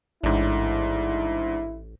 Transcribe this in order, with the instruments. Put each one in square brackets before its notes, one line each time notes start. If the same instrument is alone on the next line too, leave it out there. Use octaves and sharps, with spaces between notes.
[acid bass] A1 [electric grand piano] G#2 D4 [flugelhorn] E4